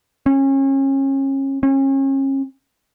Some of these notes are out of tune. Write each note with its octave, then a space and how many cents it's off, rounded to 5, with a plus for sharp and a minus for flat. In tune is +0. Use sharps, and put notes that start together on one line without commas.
C#4 -30
C#4 -35